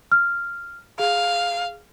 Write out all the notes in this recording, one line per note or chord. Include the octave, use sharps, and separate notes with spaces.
F6
G#4 F5